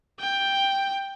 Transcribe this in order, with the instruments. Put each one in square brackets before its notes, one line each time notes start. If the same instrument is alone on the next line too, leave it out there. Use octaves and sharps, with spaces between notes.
[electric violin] G5